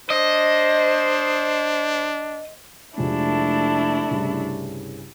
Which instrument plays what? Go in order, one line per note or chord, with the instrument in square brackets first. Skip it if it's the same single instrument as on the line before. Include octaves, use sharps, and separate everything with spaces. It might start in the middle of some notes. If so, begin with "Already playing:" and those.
[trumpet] D4 [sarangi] C5 [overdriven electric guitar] D#5
[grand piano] F1 F3 G#3 [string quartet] A3 D4 E4
[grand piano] C2 G2 C#3